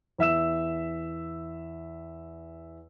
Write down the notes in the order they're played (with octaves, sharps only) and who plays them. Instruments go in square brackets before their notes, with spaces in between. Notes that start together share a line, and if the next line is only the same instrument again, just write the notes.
[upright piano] E2 E5 E6 E7